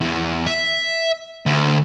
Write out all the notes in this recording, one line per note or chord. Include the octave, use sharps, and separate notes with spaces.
E2
E5
D2